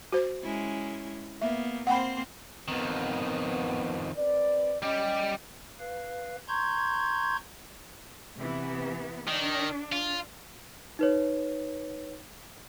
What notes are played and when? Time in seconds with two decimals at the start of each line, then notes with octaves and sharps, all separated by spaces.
0.12 F#4 C5
0.43 G#3 C#4 E4
1.41 A#3 B3 E5
1.87 A#3 C4 C5 F#5 G5 B5
2.68 F2 D#3 B3 C4
4.16 C4 B4 D5
4.82 G3 C#4 G4 D#5
5.80 B4 F5
6.48 A#5 C6 C#6 G6 G#6
8.37 C3 E3 B3
9.28 D#3 D4
9.93 F4
10.99 D#4 B4 C#5